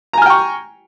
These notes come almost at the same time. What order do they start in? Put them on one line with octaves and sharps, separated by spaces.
A#5 G#5 F6 G5 C#6